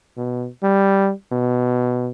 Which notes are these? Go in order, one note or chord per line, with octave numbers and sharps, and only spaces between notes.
B2
G3
B2